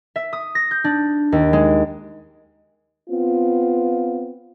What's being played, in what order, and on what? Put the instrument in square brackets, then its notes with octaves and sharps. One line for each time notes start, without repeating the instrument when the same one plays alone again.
[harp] E5
D#6
A#6
G6
D4
D#2
G#3
[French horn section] B3 C4 F4